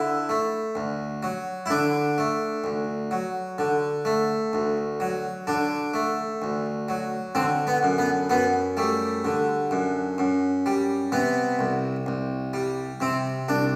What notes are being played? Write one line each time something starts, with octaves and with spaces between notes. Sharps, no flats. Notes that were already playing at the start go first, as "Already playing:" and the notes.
Already playing: D3 E4
A3
D2
F#3
E4
D3 D4
A3
D2
F#3
D3
A3
D2
F#3
D3 D4
A3
D2
F#3
D3 C4
B3
F#2
B3
F#2 B3
G3 A3
D3
F#2
F#2
G3
C3 B3
C2
C2
G3
C3 C4
C2 D4